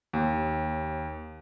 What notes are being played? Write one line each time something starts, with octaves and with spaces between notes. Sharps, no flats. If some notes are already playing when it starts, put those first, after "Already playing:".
D#2